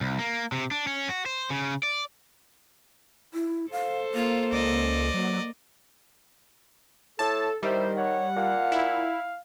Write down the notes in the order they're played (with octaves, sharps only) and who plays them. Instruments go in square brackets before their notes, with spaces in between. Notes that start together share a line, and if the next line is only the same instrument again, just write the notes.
[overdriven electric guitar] C2
A#3
C3
D4
C#4
F#4
C5
C#3
D5
[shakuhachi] E4
[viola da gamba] A4 C5 [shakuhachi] F5
[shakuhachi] A#3 [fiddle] F4
[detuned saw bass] C#2 [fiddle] D5 D#5
[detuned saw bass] F#3 [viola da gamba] A#3
[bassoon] A2 [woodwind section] A4 [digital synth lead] A5
[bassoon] D#3 [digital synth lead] G3 [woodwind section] D#4 E4 C5 [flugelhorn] E5
[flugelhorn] C#5 [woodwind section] F#5
[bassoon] A#2 [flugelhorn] F5
[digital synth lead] E4